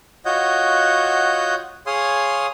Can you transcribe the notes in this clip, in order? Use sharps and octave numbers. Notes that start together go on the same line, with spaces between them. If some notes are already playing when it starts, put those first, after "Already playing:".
F4 F#4 C#5 D#5 F#5 G6
G#4 C#5 F5 C6 D#6